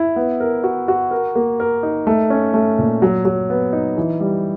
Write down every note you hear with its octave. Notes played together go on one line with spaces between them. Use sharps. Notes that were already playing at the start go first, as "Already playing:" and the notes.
Already playing: E4
B3
A#4
F#4
F#4
A#4
A#3
A#4
D#4
A3
C#4
A3
A#2
F#3
F#3
B3
D#4
E3
G3